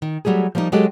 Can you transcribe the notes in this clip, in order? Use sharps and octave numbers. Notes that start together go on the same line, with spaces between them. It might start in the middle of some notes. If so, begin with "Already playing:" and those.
D#3
F#3 G3 A3 G#4
F3 G3 A#3 C4 D#4
F#3 G#3 F#4 G4 A4 D#5